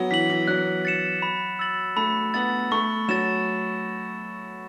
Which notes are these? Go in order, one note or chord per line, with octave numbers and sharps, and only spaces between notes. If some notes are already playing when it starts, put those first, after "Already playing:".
Already playing: F#3 B3
E3 B6 F#7
E3
F#3 F#6
A6 C#7 E7
B5
E6 A6 F#7
A3 B5
B3 A6 F#7
A3 C#6
F#3 A6 E7